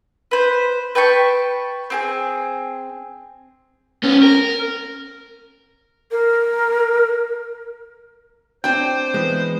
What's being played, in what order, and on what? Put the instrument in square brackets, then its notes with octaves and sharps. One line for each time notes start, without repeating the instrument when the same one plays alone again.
[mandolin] B4 C5
B4 G5 A5 C#6
C4 G4 G#4
[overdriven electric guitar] B3 C#4
A#4
[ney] A#4
[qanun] C4 D4 [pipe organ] C5 [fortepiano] G5
[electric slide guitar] E3 G#3 [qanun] B3